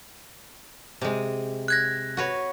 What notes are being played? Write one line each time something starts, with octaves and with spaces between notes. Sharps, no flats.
C3 G#3
F#6 G#6 A#6
F#4 B4 C#5